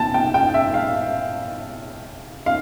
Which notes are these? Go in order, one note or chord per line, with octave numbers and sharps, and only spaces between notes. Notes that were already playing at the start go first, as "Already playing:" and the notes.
Already playing: C3 B3 G5 A5
G5
G5
E5
F5
F5